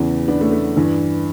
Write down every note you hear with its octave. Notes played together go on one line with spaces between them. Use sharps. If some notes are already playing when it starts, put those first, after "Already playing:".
Already playing: E2 C#3 E3
B3 D4
A3 C#4
A3
G2 E3